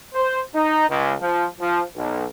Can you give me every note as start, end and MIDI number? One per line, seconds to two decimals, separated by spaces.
0.14 0.41 72
0.55 0.89 63
0.90 1.14 37
1.21 1.47 53
1.60 1.82 53
1.97 2.25 35